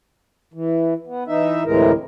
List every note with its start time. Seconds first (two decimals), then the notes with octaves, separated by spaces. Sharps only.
0.54 E3
1.07 B3
1.27 E3 D#4 E5
1.65 D2 A2 C3 E3 G#3 A#4